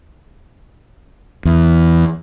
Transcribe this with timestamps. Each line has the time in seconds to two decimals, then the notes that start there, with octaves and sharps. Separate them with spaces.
1.45 E2